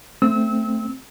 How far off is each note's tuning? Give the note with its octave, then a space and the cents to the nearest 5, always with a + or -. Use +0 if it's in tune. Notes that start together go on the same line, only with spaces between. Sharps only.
A3 +5 C4 +0 E6 -30